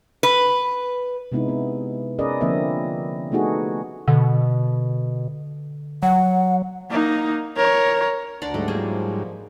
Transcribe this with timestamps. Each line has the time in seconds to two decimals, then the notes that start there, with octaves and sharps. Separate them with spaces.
0.23 B4
1.32 C3 G#3 B3 D#4 E4
1.48 B3
2.19 C#4 G#4 A#4 B4 D5 D#5
2.41 D3 F3 A#3 C4 D#5 E5
3.32 A3 B3 D#4 F#4 G#4 A4
4.08 B2 D3
6.03 F#3 F#5
6.90 A#3 D#4
7.56 A#4 C#5
8.42 D2 D4 D5 F#5 A#5 C6
8.54 G#2 F#3 G3 A3
8.68 F3 A#3 G#4 C5